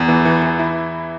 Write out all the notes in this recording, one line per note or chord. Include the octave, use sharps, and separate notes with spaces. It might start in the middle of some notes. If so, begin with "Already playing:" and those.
Already playing: E2
E3
E3
E3
E4